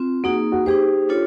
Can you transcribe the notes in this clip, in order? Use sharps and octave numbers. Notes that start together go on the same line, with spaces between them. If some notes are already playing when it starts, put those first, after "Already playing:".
Already playing: C4 F4
A#3 D#4 F#4 G#4
F#4
D#4 G4 G#4 C5
D4 F4 A4 C#5